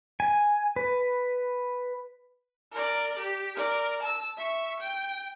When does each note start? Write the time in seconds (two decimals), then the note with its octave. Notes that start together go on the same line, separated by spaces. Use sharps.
0.20 G#5
0.76 B4
2.72 A#4 D5
3.18 G4
3.56 A#4 D5
4.02 A5 E6
4.37 E5 C#6
4.80 G5